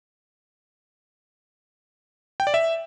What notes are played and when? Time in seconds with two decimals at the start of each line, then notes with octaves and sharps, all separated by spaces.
2.40 G5
2.47 D5
2.54 E5